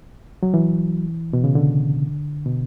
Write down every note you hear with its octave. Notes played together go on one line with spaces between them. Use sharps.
F#3
E3
B2
C#3
D3
B2